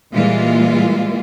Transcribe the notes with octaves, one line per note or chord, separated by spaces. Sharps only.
A#2 E3 G3 G#3 A#3 F4